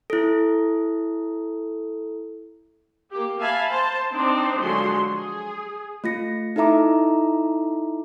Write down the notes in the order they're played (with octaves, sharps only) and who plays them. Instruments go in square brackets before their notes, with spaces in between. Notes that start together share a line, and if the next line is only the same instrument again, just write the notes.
[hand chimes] E4 A4
[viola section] A#3 G4
E5 F5 G#5 A5 B5
C5 A5
C4 D4 D#4 C5
D3 F3 F#3 G#3 F#4 C6
G#4
[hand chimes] A3 F4 A#6 C#7
D#4 E4 A4 E5 A#5 D6